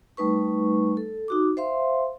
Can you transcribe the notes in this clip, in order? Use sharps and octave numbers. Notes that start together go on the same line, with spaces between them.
G3 A3 D#4 B4 C#6
A4
D#4 F#4 D6
C5 E5 F5 C6